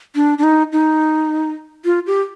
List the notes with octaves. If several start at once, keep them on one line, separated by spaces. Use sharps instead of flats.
D4
D4
D#4
D#4
F4
G4